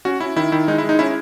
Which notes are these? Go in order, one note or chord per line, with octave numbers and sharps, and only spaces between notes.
C#4 F#4
C#4 E4
D#3 E4
D#3 E4
G#3 D#4
E4
G#3
D#4
C#4 E4